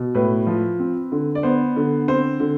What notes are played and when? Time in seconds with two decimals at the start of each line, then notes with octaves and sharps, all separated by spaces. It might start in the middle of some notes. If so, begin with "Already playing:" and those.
Already playing: B2
0.15 A2 B4
0.47 F3
0.79 C4
1.12 D3
1.35 D5
1.43 B3 C5
1.76 D3
2.08 C4 C5
2.40 D3